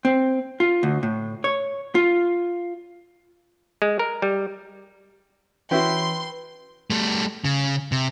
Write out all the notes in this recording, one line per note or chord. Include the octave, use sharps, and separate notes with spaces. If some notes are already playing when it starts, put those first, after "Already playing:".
C4
F4
D2
A2
C#5
F4
G#3
A#4
G3
E3 C#4 E4 F#4 B4 G5 C6
G3 A3
C#3
C3